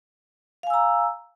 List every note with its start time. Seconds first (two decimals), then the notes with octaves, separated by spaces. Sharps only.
0.63 F5
0.67 G#5
0.70 E6
0.74 A#5